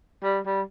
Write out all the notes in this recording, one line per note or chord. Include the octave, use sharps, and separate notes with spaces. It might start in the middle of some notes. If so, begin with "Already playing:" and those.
G3
G3